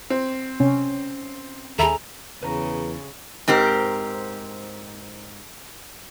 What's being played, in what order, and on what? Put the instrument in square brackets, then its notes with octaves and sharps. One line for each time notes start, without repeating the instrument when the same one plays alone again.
[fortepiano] C4
[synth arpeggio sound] C3 [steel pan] C#4
[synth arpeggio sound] D#2 E5 B5 [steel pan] G#4 A4 [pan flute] A#5
[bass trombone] E2 [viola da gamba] C#3 [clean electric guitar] B4 C#5 A#5
[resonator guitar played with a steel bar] G#2 C4 G4 A#4